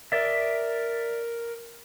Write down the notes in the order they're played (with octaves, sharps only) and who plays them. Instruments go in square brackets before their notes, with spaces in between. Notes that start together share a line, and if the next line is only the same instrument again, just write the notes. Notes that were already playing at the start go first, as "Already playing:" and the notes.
[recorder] A#4 [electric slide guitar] D5 E5